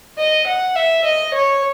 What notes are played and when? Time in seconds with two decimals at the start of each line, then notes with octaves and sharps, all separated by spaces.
0.18 D#5
0.47 F#5
0.75 E5
1.04 D#5
1.33 C#5